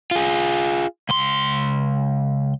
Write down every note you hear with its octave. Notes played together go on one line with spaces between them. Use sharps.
F4 G#4
C#2 C6